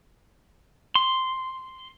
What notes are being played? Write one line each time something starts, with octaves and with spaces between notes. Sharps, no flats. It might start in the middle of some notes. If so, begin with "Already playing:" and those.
C6